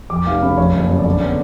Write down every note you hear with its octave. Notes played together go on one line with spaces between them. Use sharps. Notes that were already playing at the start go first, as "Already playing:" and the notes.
F2 D6
F1 F5
C#3 B5
F2 C#5
F#1
C#3
D5
D3 C#5
B3 D5